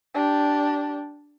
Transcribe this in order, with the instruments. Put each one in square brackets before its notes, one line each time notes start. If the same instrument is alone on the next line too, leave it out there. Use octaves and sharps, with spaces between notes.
[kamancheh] D4 G4